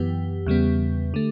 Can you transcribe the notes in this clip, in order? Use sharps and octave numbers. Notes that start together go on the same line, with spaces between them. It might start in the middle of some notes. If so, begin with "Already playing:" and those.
Already playing: F#2 E3 B3 G4
E2 C#3 G3 B3
D3 A3